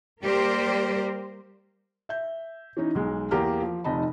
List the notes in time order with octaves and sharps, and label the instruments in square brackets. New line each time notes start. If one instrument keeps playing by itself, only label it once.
[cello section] G3 A#3 G4 A#4 C5 D5
[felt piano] E5 G6
E3 C#4 D#4
B1 G#3
E2 A#3 G4 A#5 F6
F3
F1 C3 D#4 D#5 A5 B5